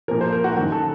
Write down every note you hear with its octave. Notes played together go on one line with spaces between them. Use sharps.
A#2 F3 A#4
C5
A#4
F#4
F#2 D#3 F#3 F#4
A4